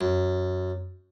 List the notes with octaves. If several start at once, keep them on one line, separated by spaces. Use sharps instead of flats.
F#2